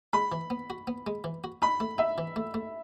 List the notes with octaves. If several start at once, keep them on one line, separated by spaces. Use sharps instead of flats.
G#3 B5
E3
B3
F#4
B3
G#3
E3
F#4
D#4 B5
A3
D#4 E5
E3
A3
A3